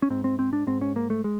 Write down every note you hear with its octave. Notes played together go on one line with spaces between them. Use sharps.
C#4
G#2 C4
C4
C4
D4
G#2 C4
C#4
A#3
A3
G#3